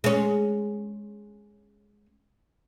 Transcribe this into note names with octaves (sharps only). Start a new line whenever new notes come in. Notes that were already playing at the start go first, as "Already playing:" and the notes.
G#3 C#4